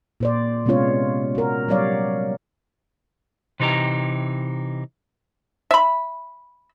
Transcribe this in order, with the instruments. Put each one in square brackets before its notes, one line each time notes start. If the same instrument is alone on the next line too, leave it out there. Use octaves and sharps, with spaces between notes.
[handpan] A#2 C5 D5
C3 G#3 B3 C#4 F4 C#5
F#4 A#4
F#3 G3 C#5 D5 F5
[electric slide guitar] C3 E3 D#4 G4 A#5
[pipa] E5 B5